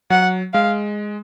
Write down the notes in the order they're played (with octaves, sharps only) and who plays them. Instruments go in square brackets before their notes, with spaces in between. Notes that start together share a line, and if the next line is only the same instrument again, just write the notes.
[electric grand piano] F#3 [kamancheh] F#5
[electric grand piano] G#3 [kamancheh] F5